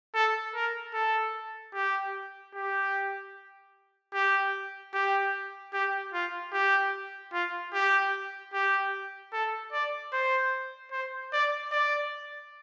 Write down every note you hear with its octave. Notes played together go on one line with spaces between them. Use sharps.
A4
A#4
A4
G4
G4
G4
G4
G4
F4
G4
F4
G4
G4
A4
D5
C5
C5
D5
D5